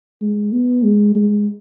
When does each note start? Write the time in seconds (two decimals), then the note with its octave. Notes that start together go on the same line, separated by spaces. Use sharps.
0.21 G#3
0.52 B3
0.83 G#3
1.15 G#3